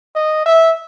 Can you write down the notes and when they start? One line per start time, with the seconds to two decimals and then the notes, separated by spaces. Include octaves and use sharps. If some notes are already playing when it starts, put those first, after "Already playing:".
0.15 D#5
0.46 E5